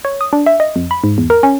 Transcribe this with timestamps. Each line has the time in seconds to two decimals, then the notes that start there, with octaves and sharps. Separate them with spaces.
0.05 C#5
0.21 D#6
0.33 D4
0.46 E5
0.60 D#5
0.76 F2
0.91 B5
1.04 G#2
1.18 E2
1.30 A#4
1.43 C#4